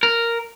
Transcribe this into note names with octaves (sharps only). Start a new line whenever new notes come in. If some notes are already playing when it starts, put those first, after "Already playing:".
A#4